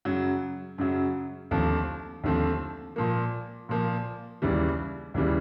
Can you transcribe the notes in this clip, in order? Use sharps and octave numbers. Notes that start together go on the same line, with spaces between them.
F#2 C#3 F#3
F#2 C#3 F#3
D#2 D3 F3 A3 C4
D#2 D3 F3 A3 C4
A#2 F3 A#3
A#2 F3 A#3
D#2 C#3 E3 G3
D#2 C#3 E3 G3